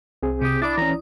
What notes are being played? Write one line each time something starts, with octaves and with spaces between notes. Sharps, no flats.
C2 C4 G#4
C3 G4 D#6
D4 E4 D5 B5 D6 D#6 A6
E3 C#4 A#5